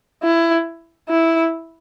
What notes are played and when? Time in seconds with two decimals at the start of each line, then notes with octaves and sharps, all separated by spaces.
0.23 E4
1.09 E4